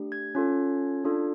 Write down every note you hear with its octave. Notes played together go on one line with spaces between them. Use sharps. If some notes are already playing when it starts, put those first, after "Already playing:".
Already playing: A3 D4 G4
G#6
C#4 F4 A4
D4 F4 A4